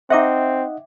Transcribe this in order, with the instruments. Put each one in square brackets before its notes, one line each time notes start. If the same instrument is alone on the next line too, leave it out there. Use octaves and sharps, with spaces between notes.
[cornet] C4 [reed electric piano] D#4 D#5 F#5 [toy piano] E5 G5 D6